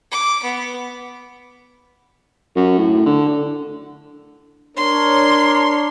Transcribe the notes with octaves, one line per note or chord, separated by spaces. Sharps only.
D6
B3
F#2
A2
D3
D4 A#4 C#5 C6